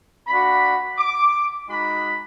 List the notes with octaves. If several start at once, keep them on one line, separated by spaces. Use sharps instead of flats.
A#3 D4 F#4 B5
D6
G#3 D#4 F#4 B5